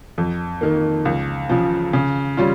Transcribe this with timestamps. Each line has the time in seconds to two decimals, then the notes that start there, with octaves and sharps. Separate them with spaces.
0.18 F2
0.61 D#3 A#3
1.05 C#2
1.49 C#3 F3
1.93 C#3
2.37 G3 C#4 F4